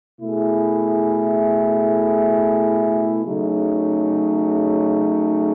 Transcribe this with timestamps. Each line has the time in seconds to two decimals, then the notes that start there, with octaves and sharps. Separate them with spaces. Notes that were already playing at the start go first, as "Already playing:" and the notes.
0.19 B2 A3 E4 G#4
3.25 C#3 F#3 A3 D#4 G#4